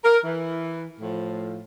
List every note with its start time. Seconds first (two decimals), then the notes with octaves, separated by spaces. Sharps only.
0.04 A#4
0.24 E3
1.01 A2 F3